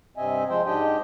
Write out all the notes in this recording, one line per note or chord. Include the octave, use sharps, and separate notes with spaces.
G2 C3 C4 D#5 E5 G#5
F3 G#3 C5 G5
G#2 D4 G4 D#5 G5